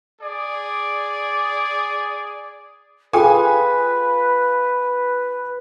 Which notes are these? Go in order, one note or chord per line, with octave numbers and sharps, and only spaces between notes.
G#4 D5
F4 G#4 A4 B4 G5 G#5